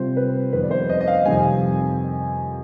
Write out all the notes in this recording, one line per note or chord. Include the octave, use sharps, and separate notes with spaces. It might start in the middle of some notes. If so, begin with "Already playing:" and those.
Already playing: C3 G3 C4 F4 C5
B4
F2 D#3 G3 B3 B4
D5
C5
D#5
D#5
F5
F2 C3 D#3 G3 G#5